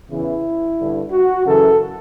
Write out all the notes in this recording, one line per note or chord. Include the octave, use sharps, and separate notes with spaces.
E2 C#3 E3 E4
G2 D3
F#4
F#2 C#3 E3 A4